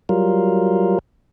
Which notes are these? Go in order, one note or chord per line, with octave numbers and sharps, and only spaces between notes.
F#3 G3 F4 A#4